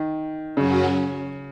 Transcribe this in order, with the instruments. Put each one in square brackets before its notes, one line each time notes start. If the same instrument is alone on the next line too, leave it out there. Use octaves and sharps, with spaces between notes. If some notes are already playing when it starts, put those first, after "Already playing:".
Already playing: [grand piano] D#3
[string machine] F#2 F#3 C#4 F#4 [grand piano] C#3